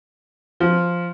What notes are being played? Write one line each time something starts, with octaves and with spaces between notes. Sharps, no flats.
F3